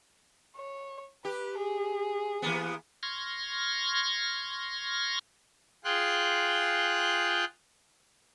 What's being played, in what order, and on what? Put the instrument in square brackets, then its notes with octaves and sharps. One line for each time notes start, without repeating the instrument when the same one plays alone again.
[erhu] C#5
[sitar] G4 [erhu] B4
[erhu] G#4
[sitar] E3 A#3 B3
[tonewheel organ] C6 C#6 F6 G#6 A#6
[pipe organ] F4 G#4 G5 C6 F#6